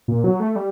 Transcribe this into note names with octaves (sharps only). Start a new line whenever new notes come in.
A#2
F#3
A3
G3